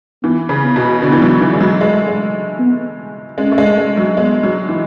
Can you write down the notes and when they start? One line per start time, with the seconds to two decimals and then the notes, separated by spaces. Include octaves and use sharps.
0.23 E3 B3
0.49 C#3
0.63 B3
0.76 B2
1.02 D3 B3
1.12 E3
1.22 F#3
1.41 E3
1.53 G#3
1.61 F#3
1.81 G#3
1.94 A3
2.08 G#3
2.59 B3
3.38 G#3 C#4
3.51 A3
3.58 G#3
3.78 G#3
3.97 F#3
4.16 G#3 B3
4.43 F#3
4.69 E3